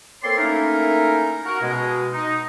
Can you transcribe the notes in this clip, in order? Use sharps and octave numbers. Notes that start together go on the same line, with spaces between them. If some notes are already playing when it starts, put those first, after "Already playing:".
A#3 C4 A4 C#5 D5 C6
A3 A#3 C#4 D#4 E4 A#4
F#4 A#4
B2 G#3
D#4